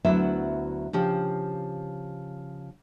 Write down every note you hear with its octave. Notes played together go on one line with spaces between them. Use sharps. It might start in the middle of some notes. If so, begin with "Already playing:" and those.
D2 F#3 B3 E4 E5
C#3 F3 G4